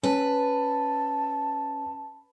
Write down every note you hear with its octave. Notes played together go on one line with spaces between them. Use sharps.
C#4 B4 A5